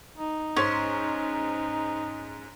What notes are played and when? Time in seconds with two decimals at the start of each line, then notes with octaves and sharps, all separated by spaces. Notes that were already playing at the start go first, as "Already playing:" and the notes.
0.18 D#4
0.57 G#2 C#4 C5 C6